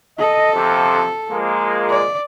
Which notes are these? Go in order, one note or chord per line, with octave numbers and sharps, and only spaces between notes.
A4 D#5
F2 C3 F3
F3 G#3 A#3
D5